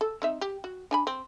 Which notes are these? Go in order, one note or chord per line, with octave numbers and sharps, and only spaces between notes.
A4
C4 D#4 E5
G4
F#4
D4 G#5 B5
C4